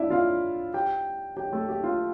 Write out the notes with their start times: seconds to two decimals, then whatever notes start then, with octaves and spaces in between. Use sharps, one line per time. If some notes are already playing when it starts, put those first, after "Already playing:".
Already playing: D4 E4 D5 E5
0.10 F4 F5
0.74 G4 G5
1.37 G4 G5
1.53 A3 A4
1.69 G4
1.84 F4